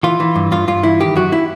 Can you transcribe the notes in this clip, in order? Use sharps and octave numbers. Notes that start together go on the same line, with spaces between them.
E3 F4
E3
G2
G2 F4
G2 F4
E3 E4
D#3 G4
F#2 F#4
E4